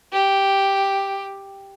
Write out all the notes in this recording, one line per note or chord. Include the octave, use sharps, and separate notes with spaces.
G4